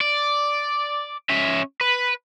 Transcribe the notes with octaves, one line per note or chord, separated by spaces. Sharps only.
D5
C#4 E5
B4